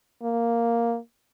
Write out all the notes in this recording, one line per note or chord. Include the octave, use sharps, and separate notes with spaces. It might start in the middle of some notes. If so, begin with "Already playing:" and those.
A#3